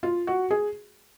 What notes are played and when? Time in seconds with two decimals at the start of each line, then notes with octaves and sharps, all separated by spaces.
0.03 F4
0.27 F#4
0.51 G#4